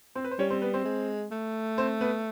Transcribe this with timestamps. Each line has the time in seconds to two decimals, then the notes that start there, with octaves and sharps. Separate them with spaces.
0.15 C4 C5
0.24 B4
0.31 C5
0.39 G3 C#4 C#5
0.50 C4 C5
0.62 B3 B4
0.74 C4 C5
0.85 G#3
1.31 A3
1.78 C4 C5
2.01 B3 B4